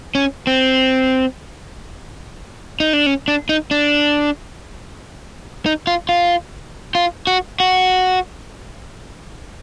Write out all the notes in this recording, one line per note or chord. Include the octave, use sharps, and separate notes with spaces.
C#4
C4
D#4
D4
C#4
D4
D#4
D4
D#4
F4
F4
F4
F#4
F#4